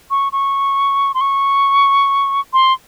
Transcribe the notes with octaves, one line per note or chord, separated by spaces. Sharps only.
C#6
C#6
C6
C#6
C6